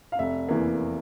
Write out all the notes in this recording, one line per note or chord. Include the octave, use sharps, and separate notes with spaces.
F5
F1 E5
E2 E3 A#3